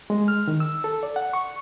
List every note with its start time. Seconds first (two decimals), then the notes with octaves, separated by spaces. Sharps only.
0.10 G#3
0.28 F6
0.47 D#3
0.60 E6
0.84 A4
1.03 D5
1.16 F#5
1.33 C#6